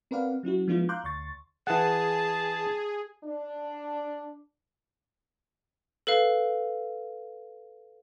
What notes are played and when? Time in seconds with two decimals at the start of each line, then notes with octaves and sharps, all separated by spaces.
0.11 C4 A#4 B4 D5 F5 F#5
0.43 F#3 C#4 E4 F#4
0.68 F3 G#3 B3 D4 E4 F4
0.89 F5 A#5 C6 D6 F#6 G6
1.04 D2 C6 C#6 A6
1.67 E3 G#4 F#5 A5
3.24 D4
6.07 A4 B4 F5